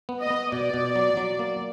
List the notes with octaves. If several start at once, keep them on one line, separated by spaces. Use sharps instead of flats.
B3
D#5
B3
B2 D5
B2
F#3
F#3
A#3